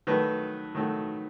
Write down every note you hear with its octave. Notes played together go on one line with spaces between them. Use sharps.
D#3 F#3 A3 B4
D#3 F#3 A3